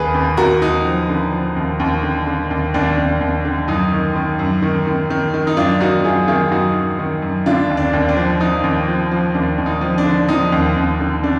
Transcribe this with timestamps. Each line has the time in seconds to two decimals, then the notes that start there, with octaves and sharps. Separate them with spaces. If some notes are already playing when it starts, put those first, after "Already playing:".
Already playing: D#2 G#4 B4
0.14 D#2
0.37 D#2 F#4 A#4
0.61 D#2 D#4
0.85 F3
1.09 D3
1.33 F3
1.56 D#2
1.80 D#2
2.03 D3
2.27 D3
2.51 D#2
2.74 D#2 D4
2.98 D#2
3.20 D#2
3.45 D3
3.68 F#2 D#4
3.92 D#3
4.16 D#3
4.39 F#2
4.62 D#3
4.87 D#3
5.10 D#3
5.34 D#3
5.47 D#4
5.57 F#2 D4 F4
5.80 D#3 D#4 F#4
6.04 F#2 F4 G#4
6.28 D#3 F4 G#4
6.51 F#2 D#4 F#4
6.75 D#3
6.99 D#3
7.22 F#2
7.46 D3 D4 F4
7.70 D#2
7.77 D4
7.93 D#2
8.09 D4
8.17 F3
8.40 F3 D#4
8.64 D#2
8.88 F3
9.12 F3
9.35 D#2 D4
9.58 D#2
9.66 D#4
9.81 F3
9.98 D4
10.05 D3
10.28 F3 D#4
10.52 D#2
10.76 D#2
11.00 D3
11.23 D3 D4